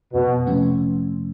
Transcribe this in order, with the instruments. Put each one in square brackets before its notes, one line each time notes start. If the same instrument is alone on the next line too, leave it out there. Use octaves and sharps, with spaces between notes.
[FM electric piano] F2 [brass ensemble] B2
[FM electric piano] C3 F3 A3 C#4